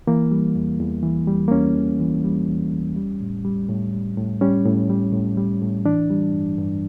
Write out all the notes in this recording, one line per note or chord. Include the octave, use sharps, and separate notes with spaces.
E3 A#3
G3
E2
E2
E3
G3
A#3
E2 C#4
E2
E3
G3
E2
E2
G3
A2
G3
A2
G3
A2
G3 C#4
A2
G3
A2
G3
A2
E3 D4
G3
G2
G2